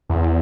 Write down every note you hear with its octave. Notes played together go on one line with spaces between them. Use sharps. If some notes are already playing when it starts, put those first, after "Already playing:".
E2